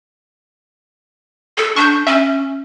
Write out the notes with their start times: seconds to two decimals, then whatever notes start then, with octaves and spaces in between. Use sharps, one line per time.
1.58 A4
1.76 D4 C#6 G6
2.07 C#4 E5